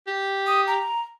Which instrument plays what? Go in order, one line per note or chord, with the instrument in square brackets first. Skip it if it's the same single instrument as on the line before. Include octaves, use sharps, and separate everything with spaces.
[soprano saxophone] G4
[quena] D#6
A#5